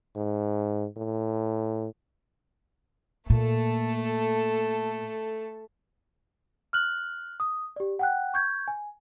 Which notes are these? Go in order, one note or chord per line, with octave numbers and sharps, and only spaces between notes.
G#2
A2
A#2 A3 A4
F6 F#6 F#7
D#6
G4 D5
F#5 G5 F#6
C#6 G6 G#6
G#5